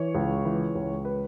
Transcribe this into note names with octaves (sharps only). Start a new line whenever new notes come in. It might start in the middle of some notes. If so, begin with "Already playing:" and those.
Already playing: E3 C#5
C#2
E3
C#2
B4